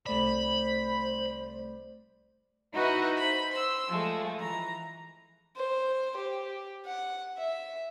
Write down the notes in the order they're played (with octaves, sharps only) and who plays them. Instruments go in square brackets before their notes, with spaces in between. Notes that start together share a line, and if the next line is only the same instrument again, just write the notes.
[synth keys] C2 A3 D5 [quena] C5 [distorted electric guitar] B5
[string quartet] D#4 E4 F#4 B4 D#5 E5
C5 B5
C6 E6
F3 G#3 A3
E3 A#5
[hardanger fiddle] C5
G4
F#5
E5